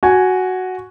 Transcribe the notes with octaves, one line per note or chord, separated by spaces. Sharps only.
F#4 G#5